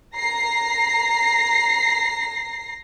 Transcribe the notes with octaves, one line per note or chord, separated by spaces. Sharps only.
A#5 A#6 C7